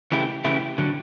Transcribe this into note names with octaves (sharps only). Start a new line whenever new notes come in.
C#3 E3 A3 E4 G4
C#3 E3 A3 E4 G4
D3 F#3